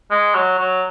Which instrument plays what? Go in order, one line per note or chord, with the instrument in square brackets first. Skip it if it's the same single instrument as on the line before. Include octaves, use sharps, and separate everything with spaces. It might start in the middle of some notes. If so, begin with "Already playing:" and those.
[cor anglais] G#3
F#3
F#3